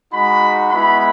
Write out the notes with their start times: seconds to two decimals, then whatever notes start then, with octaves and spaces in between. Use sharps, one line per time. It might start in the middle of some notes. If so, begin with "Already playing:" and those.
0.11 G#3 D#4 F#4 B5
0.71 G#3 B3 E4 B5